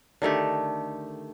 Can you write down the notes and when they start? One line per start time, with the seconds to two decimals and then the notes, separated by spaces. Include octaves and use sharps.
0.22 D3 D#3 A3 G4